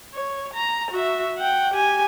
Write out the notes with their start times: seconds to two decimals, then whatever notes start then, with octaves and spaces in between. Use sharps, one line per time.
0.14 C#5
0.54 A#5
0.91 F#4 E5
1.38 F#5 G5
1.74 G4 G#5